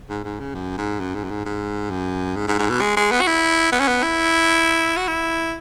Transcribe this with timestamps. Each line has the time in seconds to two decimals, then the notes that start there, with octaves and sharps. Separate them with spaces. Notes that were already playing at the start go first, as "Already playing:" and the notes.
0.09 G#2
0.24 G#2
0.39 C#3
0.54 F#2
0.77 G#2
1.00 F#2
1.15 G#2
1.24 F#2
1.30 G#2
1.45 G#2
1.90 F#2
2.36 G#2
2.47 G#2
2.59 G#2
2.70 B2
2.81 G#3
2.96 G#3
3.11 B3
3.21 F#4
3.27 E4
3.72 B3
3.80 C#4
3.88 B3
4.02 E4
4.97 F#4
5.08 E4